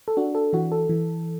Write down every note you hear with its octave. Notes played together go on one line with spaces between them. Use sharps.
A4
D4 F#4
A4
E3 F#4
A4
E3